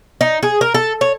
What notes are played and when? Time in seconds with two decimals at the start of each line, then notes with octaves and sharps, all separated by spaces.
0.21 D#4
0.43 G#4
0.61 A#4
0.74 A4
1.01 C#5